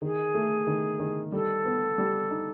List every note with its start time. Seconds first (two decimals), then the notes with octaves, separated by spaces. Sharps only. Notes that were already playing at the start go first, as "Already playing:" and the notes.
0.02 D#3 G#4
0.35 A3
0.67 D#3
1.00 D#3
1.32 G3 A4
1.65 B3
1.98 G3
2.31 D#4